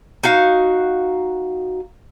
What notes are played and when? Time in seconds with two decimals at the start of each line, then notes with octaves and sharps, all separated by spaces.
0.23 D#4 F#4 F5